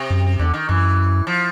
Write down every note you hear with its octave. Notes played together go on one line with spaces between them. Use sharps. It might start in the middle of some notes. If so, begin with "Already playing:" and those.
Already playing: C3
F#2
E2 D3
D#3
F#2 E3
F3